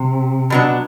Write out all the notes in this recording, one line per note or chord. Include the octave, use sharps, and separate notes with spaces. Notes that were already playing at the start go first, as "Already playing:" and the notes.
Already playing: C3
B2 F#3 B3 D4